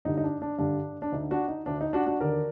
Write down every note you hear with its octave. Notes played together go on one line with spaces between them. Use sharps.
G2 D3 D#4
D#4
D4
D4
G2 D3 D4
D4
D2 D3 D#4
D4 F#4
D#4
D2 D3 D4
D#4
D4 F#4
D4 F#4
D#2 D3 A#4 D5